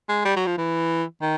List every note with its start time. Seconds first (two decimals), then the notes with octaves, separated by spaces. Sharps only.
0.09 G#3
0.25 G3
0.36 F#3
0.46 F3
0.58 E3
1.22 D#3